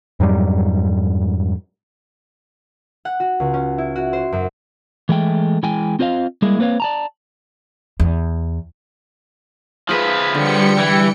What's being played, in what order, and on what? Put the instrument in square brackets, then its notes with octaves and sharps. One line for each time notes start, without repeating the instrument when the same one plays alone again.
[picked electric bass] F2 G#2 F#3 G3
[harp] F#5
F#4
C#2
C#4
E4
F#4
C5
F#2
[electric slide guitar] E3 G#3 A3 G5
E3 G#3 G5 G#5
C4 F4 C5 D#5 F5
G3 G#3 A#3 E4 G#4
A#3 C4 B4 C#5 F5
D5 A5 A#5
[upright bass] E2
[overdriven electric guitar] F3 B4 [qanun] F4 G#4 E5
[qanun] D3 [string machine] G3 G5 C#7
[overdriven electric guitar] E3